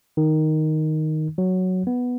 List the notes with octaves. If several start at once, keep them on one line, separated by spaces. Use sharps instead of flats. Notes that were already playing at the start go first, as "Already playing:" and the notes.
D#3
F#3
B3